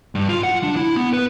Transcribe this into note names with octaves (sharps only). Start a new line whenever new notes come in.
G2
F4
F#5
D4
E4
B3
B4